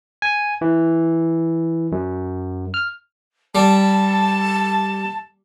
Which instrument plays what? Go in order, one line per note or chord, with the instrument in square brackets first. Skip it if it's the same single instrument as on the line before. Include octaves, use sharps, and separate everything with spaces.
[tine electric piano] G#5
E3
F#2
F6
[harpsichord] G3 [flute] A5